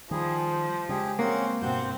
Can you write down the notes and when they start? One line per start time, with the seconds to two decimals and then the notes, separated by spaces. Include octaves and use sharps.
0.11 D#3 F3 G3 G#4
0.52 C5
0.89 C#3 G3 G#3 G4 G#4
1.19 A#3 C4 C#4 F#5
1.62 G2 B2 C4 F#4 G6